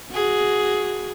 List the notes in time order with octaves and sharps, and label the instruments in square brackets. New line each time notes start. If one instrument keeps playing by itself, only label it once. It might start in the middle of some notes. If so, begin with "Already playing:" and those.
[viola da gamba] F#4 G#4